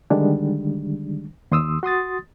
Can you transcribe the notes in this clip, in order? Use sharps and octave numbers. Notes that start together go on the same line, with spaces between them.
D3 D#3 G3 G#3 D4
D#2 C6 D#6 E6
F#4 C6 D#6 A6